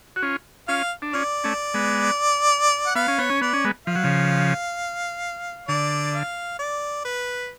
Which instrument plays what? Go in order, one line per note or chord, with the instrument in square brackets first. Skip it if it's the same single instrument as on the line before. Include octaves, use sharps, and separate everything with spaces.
[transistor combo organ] F#4
C#4 F4
[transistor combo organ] C#4 F4 [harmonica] F5
[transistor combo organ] D4
[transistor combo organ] C#4 F4 [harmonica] D5
[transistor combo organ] A3 C#4
G#3 B3
[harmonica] F#5
[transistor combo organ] B3 [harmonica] F5
[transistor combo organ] C#4
[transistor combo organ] B3 [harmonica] C#5
[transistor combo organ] C#4
[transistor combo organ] B3 [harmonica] D5
[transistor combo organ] C#4
G#3 B3
[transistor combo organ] F3 [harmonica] F5
[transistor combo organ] F#3
C#3 F3
[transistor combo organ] D3 [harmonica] D5
[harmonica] F5
D5
B4